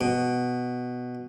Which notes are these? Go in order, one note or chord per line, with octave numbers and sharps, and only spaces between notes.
B2